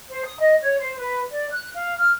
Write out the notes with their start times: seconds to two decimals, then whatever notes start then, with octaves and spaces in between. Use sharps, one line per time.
0.09 C5
0.24 D#6
0.39 D#5
0.61 C#5
0.78 C5
0.96 B4
1.31 D5
1.51 F#6
1.74 F5
1.96 F6